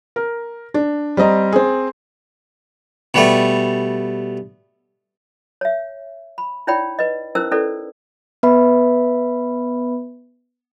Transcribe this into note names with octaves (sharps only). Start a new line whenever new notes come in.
A#4
D4
G3 C4 D#5 A#5
C4 G#4
B2 G3 A3
C#5 E5
B5
D#4 E4 C#5 D5 G5 B5
B4 D#5
C#4 D#4 E4 A#4 C5 E6
C#4 E4 A4 B4 D5
B3 B4 E5 B5